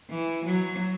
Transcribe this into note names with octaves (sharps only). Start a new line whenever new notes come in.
E3
F#3